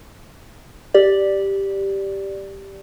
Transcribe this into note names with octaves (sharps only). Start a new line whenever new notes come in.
G4 D5